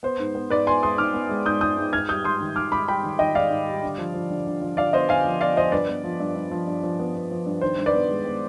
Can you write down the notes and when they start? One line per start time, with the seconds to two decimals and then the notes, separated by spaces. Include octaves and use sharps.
0.03 B3 C5
0.19 G#2
0.35 B3
0.50 G#2 B4 D5
0.67 B3 G#5 C6
0.83 G#3 C6 D#6
0.98 G#2 D6 F6
1.14 B3
1.29 G#3
1.45 G#2 D#6 G6
1.61 G#2 D#6 G6
1.77 G#2
1.93 G#2 F6 G#6
2.09 G3 D#6 G6
2.24 G#2 C6 D#6
2.41 D#3
2.56 D#3 D6 F6
2.72 G#2 B5 D6
2.88 G3 G5 B5
3.03 D#3
3.19 D#3 D#5 G5
3.35 G#2 D5 F5
3.51 G#2
3.68 G3
3.83 D3
3.98 F3
4.14 F3
4.30 D3
4.46 D3
4.61 F3
4.77 D3 D5 F5
4.93 B3 C5 D#5
5.09 D3 F5 G#5
5.25 F3
5.41 B3 D5 F5
5.57 F3 C5 D#5
5.72 G2 B4 D5
5.88 B3
6.04 F3
6.20 G2
6.36 G2
6.51 F3
6.67 G2
6.83 F3
6.99 B3
7.15 B3
7.31 F3
7.46 G2
7.61 D#3 C5
7.78 G2
7.86 B4 D5
7.94 B3
8.09 G#3
8.25 B3